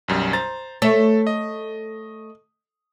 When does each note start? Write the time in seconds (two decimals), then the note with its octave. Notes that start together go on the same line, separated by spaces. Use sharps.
0.08 B1 F#2 G3
0.33 C5 A#5 A6
0.82 A3 A4 C#5 E5
1.27 D#5